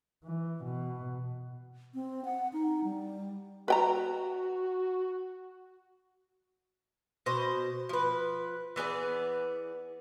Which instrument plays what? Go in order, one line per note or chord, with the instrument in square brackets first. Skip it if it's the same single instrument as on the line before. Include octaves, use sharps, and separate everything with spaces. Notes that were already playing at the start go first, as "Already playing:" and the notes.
[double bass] E3
B2
[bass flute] C4
F#5
D#4
G3
[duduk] F#4 [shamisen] B4 G5 A#5
[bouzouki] B2 C5
F3 B4
E3 B3 G#4 D5